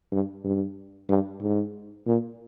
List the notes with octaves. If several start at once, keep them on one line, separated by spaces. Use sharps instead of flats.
G2
G2
G2
G#2
A#2